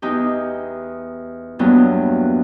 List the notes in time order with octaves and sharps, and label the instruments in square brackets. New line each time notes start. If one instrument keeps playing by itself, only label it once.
[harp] E2 D#4 G4
E2 G2 F#3 A#3 B3